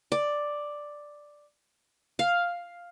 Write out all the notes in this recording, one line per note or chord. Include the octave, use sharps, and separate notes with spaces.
D5
F5